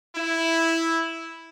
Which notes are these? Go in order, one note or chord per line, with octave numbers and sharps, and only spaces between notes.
E4